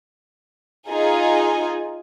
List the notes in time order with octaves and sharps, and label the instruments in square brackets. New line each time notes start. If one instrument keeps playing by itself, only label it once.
[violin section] D#4 F4 G#4 G#5